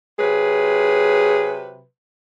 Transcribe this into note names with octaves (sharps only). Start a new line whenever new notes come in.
C3 F#3 G#4 B4